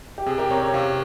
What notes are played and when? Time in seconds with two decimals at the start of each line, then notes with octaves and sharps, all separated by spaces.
0.18 G4
0.26 C3 G#4
0.38 G4 A#4
0.51 C4 A#4 C#5
0.62 A#4 C#5
0.74 C3 C#5 F5